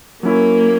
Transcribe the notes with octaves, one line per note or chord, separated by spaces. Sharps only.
F#3 A#3 C#4 E4